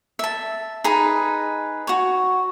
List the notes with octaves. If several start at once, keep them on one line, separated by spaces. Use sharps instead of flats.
E5 A5
D#4 G#4 B4 A#5
F#4 C#5